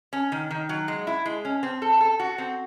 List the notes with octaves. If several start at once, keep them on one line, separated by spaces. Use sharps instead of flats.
C#4
D#3
D#3
F#3
G#3
E4
G#3
C#4
C4
A4
A4
F#4
C4